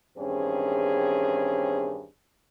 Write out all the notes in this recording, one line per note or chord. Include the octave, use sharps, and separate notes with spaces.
E2 G2 D#3 C4 C#4 G#4